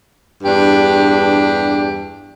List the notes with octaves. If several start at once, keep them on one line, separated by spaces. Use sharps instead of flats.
E2 G2 D4 G4